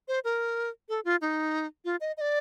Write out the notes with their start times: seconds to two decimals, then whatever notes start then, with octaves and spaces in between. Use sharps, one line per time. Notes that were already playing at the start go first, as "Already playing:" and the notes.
0.08 C5
0.24 A#4
0.89 A4
1.05 F4
1.21 D#4
1.85 F4
2.01 D#5
2.17 D#5
2.21 D5